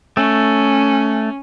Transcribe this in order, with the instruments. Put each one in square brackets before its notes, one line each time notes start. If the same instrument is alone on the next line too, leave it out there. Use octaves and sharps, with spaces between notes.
[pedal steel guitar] A3 [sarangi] C#4